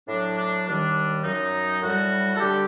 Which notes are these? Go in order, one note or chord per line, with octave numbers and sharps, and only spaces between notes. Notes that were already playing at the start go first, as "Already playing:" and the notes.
A2 F#3 D4
D4
D#2 D#3 G3 D4
F#2 F#3 D#4
A2 G3 F#4
A4
D3 G3 G4